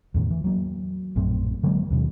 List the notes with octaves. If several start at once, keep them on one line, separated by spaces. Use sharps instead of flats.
E2 A2 D#3
E3
F#3 A#3
A#1 F#2 A2 C4
D3 F#3 G#3 A#3
D#2 B2 D#3